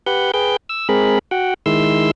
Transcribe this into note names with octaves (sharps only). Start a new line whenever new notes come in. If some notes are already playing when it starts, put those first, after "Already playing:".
G4 B4 F#5 G6
G#4 B4 G5 G6
E6
G#3 C4 G#4 A#4 B5
F#4 F#5 G5
D#3 G#3 E4 C6 E6